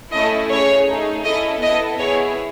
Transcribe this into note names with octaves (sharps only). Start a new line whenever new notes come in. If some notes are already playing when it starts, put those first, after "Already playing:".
A3 C#4 E4 A4 D#5
C#4 G#4 C#5
A3 D#4 G#4
C#4 E4 A4 D#5
B3 E4 A4 D#5
B3 E4 G#4 C#5